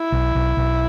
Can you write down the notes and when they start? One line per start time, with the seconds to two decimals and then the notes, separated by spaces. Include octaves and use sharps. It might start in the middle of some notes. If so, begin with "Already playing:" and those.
Already playing: E4
0.12 B1
0.35 B1
0.57 B1